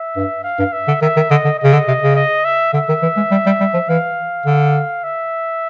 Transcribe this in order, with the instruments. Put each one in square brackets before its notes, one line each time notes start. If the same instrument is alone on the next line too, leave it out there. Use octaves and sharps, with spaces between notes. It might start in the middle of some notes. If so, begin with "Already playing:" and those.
Already playing: [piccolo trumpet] E5
[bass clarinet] G2
[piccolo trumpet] F5
[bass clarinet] G2
[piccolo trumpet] E5
[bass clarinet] D3
[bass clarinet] D#3 [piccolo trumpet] E5
[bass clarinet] D#3
[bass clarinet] D3 [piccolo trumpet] D#5
[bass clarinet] D3
[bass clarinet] C#3 [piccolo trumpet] D#5
[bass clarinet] D3
C3
C#3
[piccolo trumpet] D#5
E5
[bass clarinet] D3 [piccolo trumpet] E5
[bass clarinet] D#3
E3
G#3
G3
G3
G3
F3
[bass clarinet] E3 [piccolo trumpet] F5
[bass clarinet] D3
[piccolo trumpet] E5